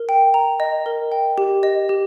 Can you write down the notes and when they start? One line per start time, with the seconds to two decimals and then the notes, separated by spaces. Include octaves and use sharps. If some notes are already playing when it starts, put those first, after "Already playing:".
Already playing: A#4
0.09 G5
0.34 A#5
0.60 D#5
0.86 A#4
1.12 G5
1.38 G4
1.63 D#5
1.89 G4